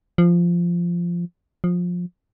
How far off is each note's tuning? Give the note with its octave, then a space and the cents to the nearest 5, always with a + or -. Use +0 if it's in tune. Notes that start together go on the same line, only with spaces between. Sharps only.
F3 -10
F3 +20